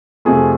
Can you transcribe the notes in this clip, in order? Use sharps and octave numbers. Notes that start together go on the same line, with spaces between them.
F2 C3 F3 A3 G#4